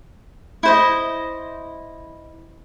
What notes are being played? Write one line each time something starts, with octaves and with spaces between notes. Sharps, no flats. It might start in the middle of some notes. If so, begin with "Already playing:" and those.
E4 C5 D#5